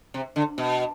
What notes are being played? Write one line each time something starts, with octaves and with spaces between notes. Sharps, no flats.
C3
D3
B2